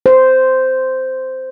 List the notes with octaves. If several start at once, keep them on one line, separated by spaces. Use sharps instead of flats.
C5